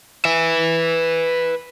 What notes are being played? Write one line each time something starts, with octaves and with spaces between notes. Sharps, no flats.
B4 E5